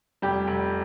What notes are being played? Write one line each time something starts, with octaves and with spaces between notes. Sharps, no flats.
F1 G3 G4
F1